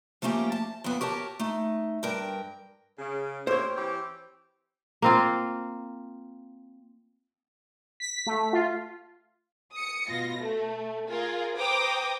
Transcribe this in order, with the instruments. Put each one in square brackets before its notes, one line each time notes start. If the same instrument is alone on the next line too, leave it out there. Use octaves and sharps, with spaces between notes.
[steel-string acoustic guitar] F3 A3 A#3 C#4 G4
A5
F2 C#3 B3
G4 A#4 C#5 A5
A3 D#4
G2 A#4 G5
[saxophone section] C#3
[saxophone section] A#3 C4 G4 [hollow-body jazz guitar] C5 C#5
[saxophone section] E3 C4 G4
[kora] A#3 C4 F4
[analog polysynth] B6
A3
F4
[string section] D#6 C#7
B2 F4 A#6
A3
F4 G#4 A#4
B4 C5 G5 A#5 D6 D#6